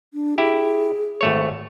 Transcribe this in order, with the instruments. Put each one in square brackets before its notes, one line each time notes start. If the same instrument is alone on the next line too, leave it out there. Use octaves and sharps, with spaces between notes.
[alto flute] D4
[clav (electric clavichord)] E4 G4 [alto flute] G#4
[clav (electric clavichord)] G#1 A3 C#5